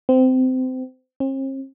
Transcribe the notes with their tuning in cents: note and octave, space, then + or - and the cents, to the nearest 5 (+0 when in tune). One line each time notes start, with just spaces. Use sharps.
C4 -25
C4 +45